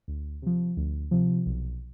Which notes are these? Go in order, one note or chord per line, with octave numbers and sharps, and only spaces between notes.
D2
C3 F3
D2
C3 F3
B1